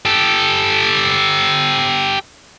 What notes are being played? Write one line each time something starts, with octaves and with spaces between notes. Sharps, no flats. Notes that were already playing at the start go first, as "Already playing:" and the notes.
G4 A4